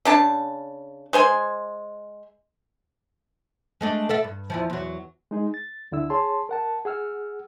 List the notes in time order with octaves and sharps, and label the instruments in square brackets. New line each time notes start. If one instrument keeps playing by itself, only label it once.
[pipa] C#3 D4 A5
G#3 C5 G#5
[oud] G#3 A3 D4
A4 D5 E5
G2
E2 E3 F3
E2 F#3
[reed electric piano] G#3 D#4 G#4
A6
D2 D3 E4 E6
G#4 C#5 A5 C6
A#4 F#5 A5
G#4 F#5 E6 F6